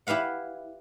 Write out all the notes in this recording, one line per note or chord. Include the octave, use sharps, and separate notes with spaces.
E4 G4 B4 F5 F#5